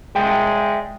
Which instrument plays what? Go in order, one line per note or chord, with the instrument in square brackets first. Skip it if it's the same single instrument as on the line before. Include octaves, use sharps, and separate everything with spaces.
[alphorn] G#3 [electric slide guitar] D5 E5 G5